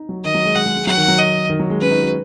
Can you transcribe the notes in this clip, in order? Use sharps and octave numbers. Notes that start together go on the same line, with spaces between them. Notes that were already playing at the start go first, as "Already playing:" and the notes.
Already playing: D#4
F#3
D#3 D#5
F#3
G#3
G#3 F#5
G#3
G#3
F#3 F#5
D#3
F#3
D#5
D#3
F#3
G#3
C#4 B4
D#4
F#4